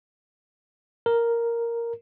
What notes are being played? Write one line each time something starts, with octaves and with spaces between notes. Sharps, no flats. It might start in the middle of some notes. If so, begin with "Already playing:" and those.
A#4